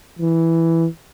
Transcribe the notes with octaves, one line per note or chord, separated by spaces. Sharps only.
E3